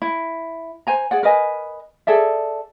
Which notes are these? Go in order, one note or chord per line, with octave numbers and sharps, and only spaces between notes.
E4
C5 G#5 A#5
G#4 D5 F#5
A#4 B4 D#5 G#5
G#4 A4 D5 E5